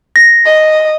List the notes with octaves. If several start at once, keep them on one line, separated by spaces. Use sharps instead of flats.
A#6
D#5